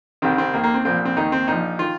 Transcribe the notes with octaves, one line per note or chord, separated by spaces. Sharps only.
C2 C3 D#3 C4
C4
D#2 D#3 A#3
A#3
C4
C2 A#2 F3 C4
C4
D#2 D#3 D#4
C4
A#1 A#2 F3 D#4
D#3 F4